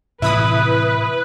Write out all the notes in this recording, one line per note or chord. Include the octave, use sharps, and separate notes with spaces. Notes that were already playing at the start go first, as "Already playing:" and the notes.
A2 C3 E3 E4 B4 B5 D#6